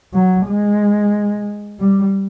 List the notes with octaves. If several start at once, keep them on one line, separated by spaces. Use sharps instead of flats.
F#3
G#3
G3